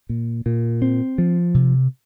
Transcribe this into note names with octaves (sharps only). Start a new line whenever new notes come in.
A#2
A#2
C4
F3
C3